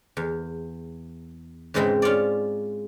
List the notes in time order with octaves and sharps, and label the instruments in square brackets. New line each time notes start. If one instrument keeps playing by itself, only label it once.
[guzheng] E2
G#2 C#3 E3 G#3 C4 E4
C#4 F4 C#5 D5